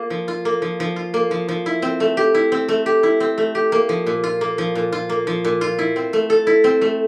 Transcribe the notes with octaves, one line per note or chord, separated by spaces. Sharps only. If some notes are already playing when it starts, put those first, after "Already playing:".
Already playing: A#3 F4
F3
F4
A#3
F3
F3
F4
A#3
F3
F3
E4
C4
A3
G4
E4
C4
A3
G4
E4
C4
A3
G4
A#3
F3
A#2
F4
A#3
F3
A#2
F4
A#3
F3
A#2
F4
E4
C4
A3
A4
E4
C4
A3